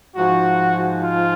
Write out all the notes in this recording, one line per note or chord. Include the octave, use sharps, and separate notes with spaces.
G#2 F3 F#4
F4